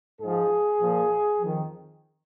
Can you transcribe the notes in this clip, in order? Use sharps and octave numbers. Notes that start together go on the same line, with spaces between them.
G#2 F3 G#4
A#2 F3
F2 D#3